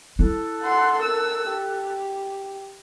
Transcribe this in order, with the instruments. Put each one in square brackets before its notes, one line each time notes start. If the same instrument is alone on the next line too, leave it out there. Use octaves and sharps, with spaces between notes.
[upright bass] E4 [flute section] A4 F#6
[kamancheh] F#5 C6
A#4 E6
G4